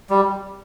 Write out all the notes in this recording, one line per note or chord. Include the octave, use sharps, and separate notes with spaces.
G3